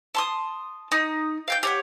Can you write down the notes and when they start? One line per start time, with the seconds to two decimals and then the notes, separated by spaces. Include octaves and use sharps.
0.15 A5 C6 D#6
0.92 D#4 D#6
1.48 F5 G5 G6
1.63 G4 C#5 F#5